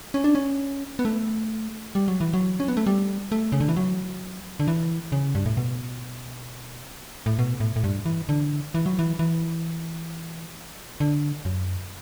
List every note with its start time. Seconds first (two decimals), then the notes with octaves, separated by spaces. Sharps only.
0.14 C#4
0.24 D4
0.35 C#4
0.99 B3
1.05 A3
1.95 G3
2.08 F#3
2.21 E3
2.33 F#3
2.60 C#4
2.68 B3
2.77 A3
2.86 G3
3.32 A3
3.52 C#3
3.60 D3
3.69 E3
3.76 F#3
4.60 D3
4.68 E3
5.12 C#3
5.35 G2
5.46 A2
5.57 B2
7.26 A2
7.39 B2
7.60 A2
7.76 A2
7.84 G2
8.06 E3
8.29 D3
8.74 E3
8.86 F#3
8.99 E3
9.19 E3
11.00 D3
11.45 F#2